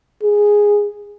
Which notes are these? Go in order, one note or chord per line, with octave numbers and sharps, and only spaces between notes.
G#4